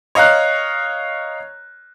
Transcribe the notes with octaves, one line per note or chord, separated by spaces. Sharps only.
C#5 D#5 F5 A#5 F#6